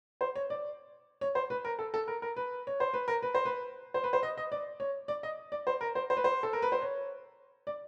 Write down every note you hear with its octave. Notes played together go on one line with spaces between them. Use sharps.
C5
C#5
D5
C#5
C5
B4
A#4
A4
A4
A#4
A#4
B4
C#5
C5
B4
A#4
B4
C5
B4
C5
B4
C5
D#5
D#5
D5
C#5
D5
D#5
D5
C5
A#4
C5
C5
B4
C5
A4
A#4
B4
C5
C#5
D5